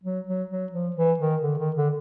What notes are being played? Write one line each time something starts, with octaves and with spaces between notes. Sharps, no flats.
F#3
F#3
F#3
F3
E3
D#3
D3
D#3
D3